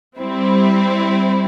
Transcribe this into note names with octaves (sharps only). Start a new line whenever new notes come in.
G3 C4 E4